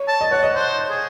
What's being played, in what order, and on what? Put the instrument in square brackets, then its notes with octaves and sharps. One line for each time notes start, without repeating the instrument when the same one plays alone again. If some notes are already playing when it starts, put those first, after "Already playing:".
Already playing: [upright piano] C#5
[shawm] A5
[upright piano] D#5
[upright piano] C#5 [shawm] F#5
[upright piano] D#5
[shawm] C5
G#4